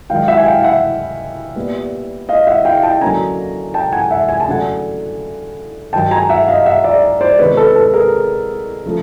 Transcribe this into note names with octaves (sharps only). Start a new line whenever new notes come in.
G#2 D#3 F#3 F5 G5
E5 F#5
G#5
F5 G5
E5 F#5
A#2 G3 B3
D#5 F5
E5 F#5
F5 G5
G5 A5
D3 F#3 A#3 C#4 G#5 A#5
G5 A5
F#5 G#5
E5 F#5
G#5
A5
D3 F#3 A3 C#4 F#5 G#5
G2 D#3 F#3 G5 A5
G#5 A#5
E5 F#5
D#5 F5
E5 F#5
D5 E5
C5 D5
C3 D#3 G#3 B3 B4 C#5
A4 B4
A4 B4
G#4 A#4
C#3 F3 A3